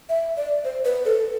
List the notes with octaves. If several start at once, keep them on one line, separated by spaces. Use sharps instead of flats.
E5
D5
C5
B4
A4